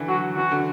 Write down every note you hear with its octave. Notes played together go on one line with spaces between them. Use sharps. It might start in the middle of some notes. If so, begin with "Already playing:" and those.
Already playing: D3 E3
F#3 F#4
E3 F#4
D3